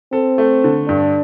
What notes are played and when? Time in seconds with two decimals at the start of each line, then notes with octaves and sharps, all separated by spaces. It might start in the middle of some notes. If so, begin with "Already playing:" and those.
0.13 C4 A4
0.38 A3
0.64 D3
0.89 G2 D4